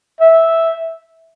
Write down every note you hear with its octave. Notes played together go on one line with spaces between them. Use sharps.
E5